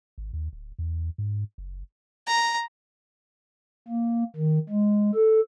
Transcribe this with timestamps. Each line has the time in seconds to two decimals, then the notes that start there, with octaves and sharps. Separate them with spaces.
0.18 G#1
0.33 D#2
0.53 D1
0.79 E2
1.18 G#2
1.58 F#1
2.27 A#5
3.88 A#3
4.37 D#3
4.70 G#3
5.14 A4